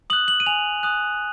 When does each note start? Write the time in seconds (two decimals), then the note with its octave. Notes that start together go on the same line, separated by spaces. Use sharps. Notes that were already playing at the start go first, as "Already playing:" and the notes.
0.10 D#6 F#7
0.13 F#6
0.28 F#7
0.40 D#7
0.46 G#5 F7
0.83 D#6 F#6